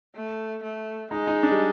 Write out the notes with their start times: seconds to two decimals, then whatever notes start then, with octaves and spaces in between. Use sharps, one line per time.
0.16 A3
0.63 A3
1.11 G#3 D#4
1.27 D#4
1.43 D4
1.51 G3